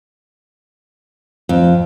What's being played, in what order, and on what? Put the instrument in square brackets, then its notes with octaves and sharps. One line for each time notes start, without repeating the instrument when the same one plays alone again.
[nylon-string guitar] F2